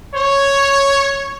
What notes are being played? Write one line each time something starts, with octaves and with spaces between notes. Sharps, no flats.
C#5